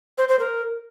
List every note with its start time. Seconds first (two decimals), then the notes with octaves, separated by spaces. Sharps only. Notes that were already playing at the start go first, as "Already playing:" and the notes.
0.18 C5
0.29 C5
0.39 A#4